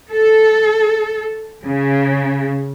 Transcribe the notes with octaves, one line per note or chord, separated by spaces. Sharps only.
A4
C#3